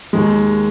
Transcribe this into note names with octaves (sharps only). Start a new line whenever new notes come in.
D#2 D#3 G#3